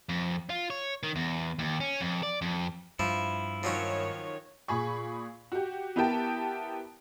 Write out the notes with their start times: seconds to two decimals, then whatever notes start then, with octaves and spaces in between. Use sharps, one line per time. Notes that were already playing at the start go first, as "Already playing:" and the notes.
0.09 F2
0.50 F4
0.70 C#5
1.03 D#3
1.16 E2
1.59 D#2
1.80 C#4
2.01 F2
2.23 D5
2.42 F2
2.99 G2 F3 E4
3.63 D#3 F3 F#3 C#4 C#5
4.68 A#2 G#4 B5 C#6
5.52 F#4 G4
5.96 B3 E4 G4 A#4 G5 A5